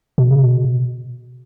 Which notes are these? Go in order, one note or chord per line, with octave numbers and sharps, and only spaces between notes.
B2
C#3
B2